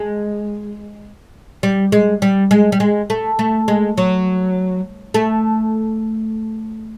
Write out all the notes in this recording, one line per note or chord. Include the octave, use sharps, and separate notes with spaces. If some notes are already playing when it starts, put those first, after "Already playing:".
Already playing: G#3
G3
G#3
G3
G#3
G3
G#3
A3
A3
G#3
F#3
A3